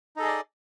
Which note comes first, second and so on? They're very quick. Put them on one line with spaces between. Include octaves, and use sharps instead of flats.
D#4 A4 G#4 D#5 D5